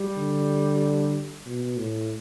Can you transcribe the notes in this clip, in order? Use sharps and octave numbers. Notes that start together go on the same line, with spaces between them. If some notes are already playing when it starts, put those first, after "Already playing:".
Already playing: G3
D3
B2
A2